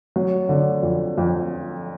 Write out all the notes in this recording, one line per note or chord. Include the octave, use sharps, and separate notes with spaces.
F#3
D3
F2
F2